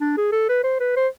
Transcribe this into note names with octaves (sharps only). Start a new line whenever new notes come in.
D4
G#4
A4
B4
C5
B4
C5